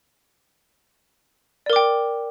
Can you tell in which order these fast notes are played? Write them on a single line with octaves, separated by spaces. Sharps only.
D5 A#4 D6 G5